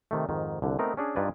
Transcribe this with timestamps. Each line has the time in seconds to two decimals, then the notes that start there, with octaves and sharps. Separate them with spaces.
0.11 C3 D#3 A3
0.29 F2 G#2 D#3
0.62 C2 D3
0.79 A3 B3 C4 D#4 A#4
0.97 C#4 D4 G#4
1.16 G2 D#4 F4 B4 D5 G#5